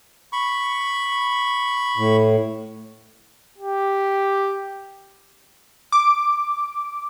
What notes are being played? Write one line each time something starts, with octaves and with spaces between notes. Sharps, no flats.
B5 C#6
A2
G4
D6